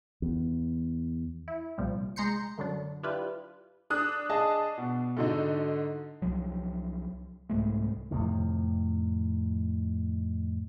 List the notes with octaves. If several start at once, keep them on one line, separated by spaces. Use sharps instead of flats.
E2
E4
C2 A#2 F3 G3
G#3 A#5 C6 G6 C#7
F#2 D3 F#3 D4
D4 E4 F4 G4 B4
D4 D#6 F#6
G#4 D#5 A5
B2
G#2 D3 D#4 F#4 A4
C2 F3 F#3
C2 G#2 G#3 A3
F2 A2 C3 D#3